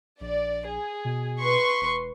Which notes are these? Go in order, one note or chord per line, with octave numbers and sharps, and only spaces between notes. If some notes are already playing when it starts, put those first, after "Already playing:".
A#1 D5
G#4
B2
B4 C6 C#6
E1